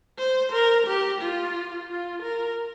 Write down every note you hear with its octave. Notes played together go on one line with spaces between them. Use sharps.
C5
A#4
G4
F4
F4
A#4